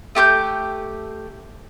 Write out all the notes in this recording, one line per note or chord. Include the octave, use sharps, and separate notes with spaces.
A3 G4 C6 G6